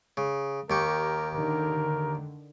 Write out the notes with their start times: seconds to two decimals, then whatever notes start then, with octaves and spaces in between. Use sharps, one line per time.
0.17 C#3
0.70 D#2 G4 A#4 C#6
1.34 D3 D#3 A#4